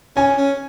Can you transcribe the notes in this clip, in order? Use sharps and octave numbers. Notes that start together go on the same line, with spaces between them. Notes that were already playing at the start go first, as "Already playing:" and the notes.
C#4 G#5
C#4